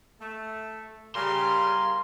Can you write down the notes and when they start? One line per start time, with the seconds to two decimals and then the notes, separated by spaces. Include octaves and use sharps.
0.20 A3
1.15 C#3 G3 A#4 F5 G#5 C6